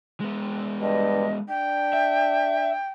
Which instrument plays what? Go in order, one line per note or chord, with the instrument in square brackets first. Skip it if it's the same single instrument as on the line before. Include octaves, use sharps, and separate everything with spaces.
[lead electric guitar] G#3 B3
[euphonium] G2 [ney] D#5
[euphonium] D4 [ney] G5
[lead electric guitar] E5